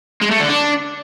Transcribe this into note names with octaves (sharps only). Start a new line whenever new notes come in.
G#3
A3
D3
D4